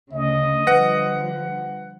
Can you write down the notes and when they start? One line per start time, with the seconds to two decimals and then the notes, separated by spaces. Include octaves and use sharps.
0.12 D2 C#3 D#5
0.67 D3 F3 G3 B4 F#5 A#6